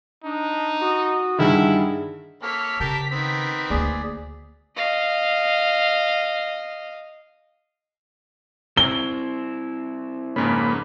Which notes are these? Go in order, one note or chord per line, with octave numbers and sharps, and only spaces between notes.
D4 D#4
F#4 D#6
G2 D3 D#3 E4 G#4
A#3 A4 C#5 B6
C#3 G4 A#4 A5
D#3 B3 C4
D2 A#3 G#4 D5
D#5 F5
C4 E4 G7
F2 G#2 C#3 A#3 C#4 B5